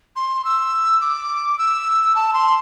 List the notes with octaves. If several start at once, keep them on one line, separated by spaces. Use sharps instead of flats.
C6
E6
D6
E6
A5
C6